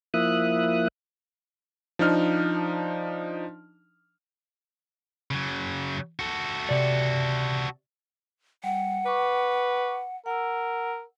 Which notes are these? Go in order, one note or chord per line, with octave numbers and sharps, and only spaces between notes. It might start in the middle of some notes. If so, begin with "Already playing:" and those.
F3 A#3 E4 E5 D#6 F#6
F3 D4 D#4 F6
C#3 F#3
F#4 A4
C3 D5
G3 F#5
B4 C#6 D6
A#4 F#5 E6